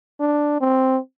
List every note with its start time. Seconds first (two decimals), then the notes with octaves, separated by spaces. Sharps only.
0.20 D4
0.61 C4